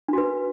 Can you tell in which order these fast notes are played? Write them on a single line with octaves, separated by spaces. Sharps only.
D4 F#4 B4